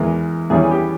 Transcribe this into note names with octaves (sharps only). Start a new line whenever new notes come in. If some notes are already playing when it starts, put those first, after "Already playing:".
Already playing: E2 E3 G#3 A#4
E2 E3 G3 C#4 G#4
G#4
G4